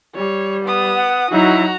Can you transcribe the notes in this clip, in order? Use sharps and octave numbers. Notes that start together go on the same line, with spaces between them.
G3 C#5
B3 D#6
F#5
F#3 D#4 E4 F#4 A#5